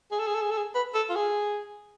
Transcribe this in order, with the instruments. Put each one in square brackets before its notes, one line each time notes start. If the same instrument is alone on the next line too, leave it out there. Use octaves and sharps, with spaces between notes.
[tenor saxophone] G#4
A4
G#4
A4
G#4
A4
G#4
B4
A4
F4
G#4